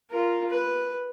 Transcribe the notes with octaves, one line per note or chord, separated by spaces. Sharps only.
F4 A#4
B4